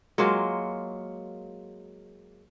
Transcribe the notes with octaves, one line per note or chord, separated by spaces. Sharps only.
F#3 G#3 A#3 F4